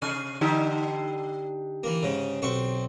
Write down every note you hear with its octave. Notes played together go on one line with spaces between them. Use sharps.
C3 G#5
D3 D#4 G4
E3 A#3
G#2 C#3
B1 C4 C#6